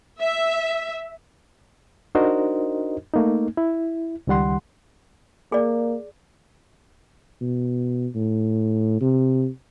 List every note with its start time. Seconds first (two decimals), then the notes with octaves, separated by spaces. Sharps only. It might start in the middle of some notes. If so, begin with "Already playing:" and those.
0.20 E5
2.15 D4 D#4 F#4 A#4 C5 D#5
3.14 A3 A#3 D#4
3.57 E4
4.27 C#2 D#3 G3 F#5 C6
5.52 A#3 G#4 D5
7.41 B2
8.15 A2
9.01 C3